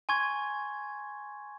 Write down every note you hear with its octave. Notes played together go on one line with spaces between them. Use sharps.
G#5 C6 C#6 G#6